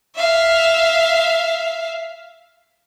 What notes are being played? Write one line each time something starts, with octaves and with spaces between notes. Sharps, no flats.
E5 F5